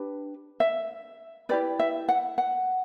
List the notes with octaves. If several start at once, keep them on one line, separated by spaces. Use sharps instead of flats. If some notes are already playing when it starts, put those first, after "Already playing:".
Already playing: D4 G4 B4
E5
E4 G4 B4 D5
E5
F#5
F#5